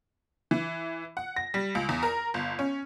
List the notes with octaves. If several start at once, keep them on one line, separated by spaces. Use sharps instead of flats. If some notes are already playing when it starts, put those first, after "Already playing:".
E3
F#5
A#6
G3
C#2
E2
A#4
G1
C#4